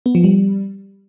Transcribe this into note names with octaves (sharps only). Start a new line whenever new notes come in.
B3
F3
G3